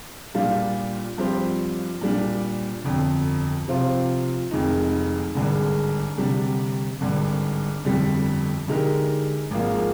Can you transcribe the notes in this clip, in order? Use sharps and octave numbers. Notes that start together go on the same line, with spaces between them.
A#2 G3 D4 F4
G2 F3 C4 G4 C5
A#2 G3 D4
G1 F2 D3
C3 F3 C4 F4 C5
F1 F2 D#3 G#3 D#4
G#1 G2 D3 G#3
D2 C3 G3 D4
G#1 G2 D3
G1 F2 D3 G3
D3 G#3 D#4 G4 A#4
G#1 G#2 F3 A#3